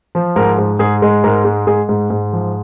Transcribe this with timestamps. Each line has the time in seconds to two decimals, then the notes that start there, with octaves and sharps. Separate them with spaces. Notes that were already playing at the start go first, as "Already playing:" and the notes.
0.15 F3
0.36 G#2 A#4
0.58 G#2
0.79 G#2 G#4
1.02 G#3
1.24 G#2 A#4
1.45 G#3
1.67 G#3 G#4
1.89 G#2
2.10 G#2
2.33 F3